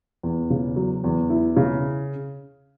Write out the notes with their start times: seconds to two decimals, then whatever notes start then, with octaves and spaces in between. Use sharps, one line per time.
0.23 E2
0.50 C#3
0.76 F#3
1.04 E2
1.30 E4
1.56 C#3